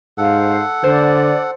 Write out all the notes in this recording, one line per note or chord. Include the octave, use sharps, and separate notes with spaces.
G#2 A4 C5 F5 F#5
D3 C5 D5